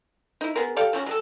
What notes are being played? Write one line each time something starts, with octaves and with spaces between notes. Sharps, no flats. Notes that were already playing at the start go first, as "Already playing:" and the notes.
D#4 E4
B3 G#4 A#4
G4 A4 D5 F5
F3 A3 C#4 F#4
F#3 G#4 A4